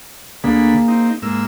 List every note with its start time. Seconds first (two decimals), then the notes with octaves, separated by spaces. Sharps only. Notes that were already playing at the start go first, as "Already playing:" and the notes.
0.44 D2 D3 A#3 G#4 B5
0.88 C4 D#4
1.22 G#2 A#3 E6